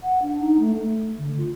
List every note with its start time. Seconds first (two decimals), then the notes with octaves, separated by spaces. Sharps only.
0.03 F#5
0.22 D4
0.40 D#4
0.60 A3
0.76 A3
1.18 D3
1.38 F4